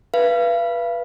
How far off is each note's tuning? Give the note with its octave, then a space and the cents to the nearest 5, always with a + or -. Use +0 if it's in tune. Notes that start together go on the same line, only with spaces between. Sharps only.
B4 -20 F5 -40